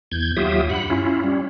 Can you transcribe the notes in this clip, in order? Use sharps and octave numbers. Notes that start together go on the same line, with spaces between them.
E2 G6 G#6
D#2 F#3 F4 G4 E5 D#6
G2 F#5 B5
C#4 E4 F4
G3 C#4